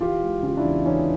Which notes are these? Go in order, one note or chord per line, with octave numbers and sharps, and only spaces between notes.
E3 F4 G4
G#3
C#3 F4
D4 E4
E2
E3 C#4 D#4